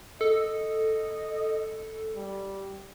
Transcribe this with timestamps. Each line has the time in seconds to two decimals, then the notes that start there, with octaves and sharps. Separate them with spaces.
0.21 A4 D#5
2.16 G3